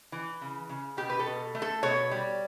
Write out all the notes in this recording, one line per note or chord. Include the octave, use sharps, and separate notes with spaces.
E3
C#3
C#3
B2 G4
B4
A4
B2
A3
A4
B2 C#5
G3